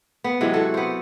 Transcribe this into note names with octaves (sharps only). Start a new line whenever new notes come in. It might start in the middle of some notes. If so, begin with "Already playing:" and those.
B3
C3 E3 F#3 G#3
F#4 A4
B3 C5